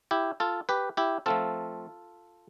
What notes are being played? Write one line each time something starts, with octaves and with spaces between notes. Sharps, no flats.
E4 G4
F4 A4
G4 B4
E4 G4
F3 A3 C4 F4 A4